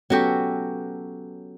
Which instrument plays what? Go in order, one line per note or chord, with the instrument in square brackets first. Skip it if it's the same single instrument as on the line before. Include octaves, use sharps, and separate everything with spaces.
[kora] F#3 F#4 G4 [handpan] B3 C#4 A4